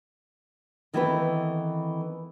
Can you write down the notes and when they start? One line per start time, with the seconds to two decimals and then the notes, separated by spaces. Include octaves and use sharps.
0.93 D#3 E3 A3 B3 C4 B4